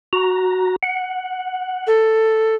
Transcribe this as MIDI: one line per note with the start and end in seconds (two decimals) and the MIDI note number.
0.13 0.76 66
0.13 0.76 82
0.83 1.88 78
1.87 2.55 69